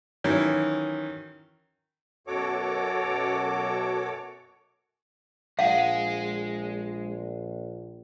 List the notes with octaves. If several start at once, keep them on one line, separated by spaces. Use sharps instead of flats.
D#3 E3 F#3 C#4
F#2 B2 F#4 A4 C#5 D6
A#1 G#3 G#4 F5 F#5